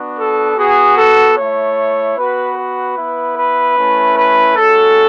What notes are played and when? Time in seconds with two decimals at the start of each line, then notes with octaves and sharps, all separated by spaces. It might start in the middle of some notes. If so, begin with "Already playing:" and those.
Already playing: B3 D4 F#4
0.17 A4
0.57 B3 F#4 G#4
0.97 A4
1.37 A3 E4 C#5
2.16 B3 F#4 B4
2.56 B4
2.97 B3 E4
3.36 B4
3.77 A3 C#4 E4
4.16 B4
4.56 G#3 C#4 F#4 A4